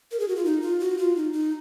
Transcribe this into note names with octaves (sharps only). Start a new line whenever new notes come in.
A#4
G#4
F#4
F4
D#4
F4
F#4
F4
D#4
D#4